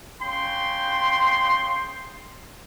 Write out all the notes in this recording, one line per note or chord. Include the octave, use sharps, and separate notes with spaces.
C#3 G5 C6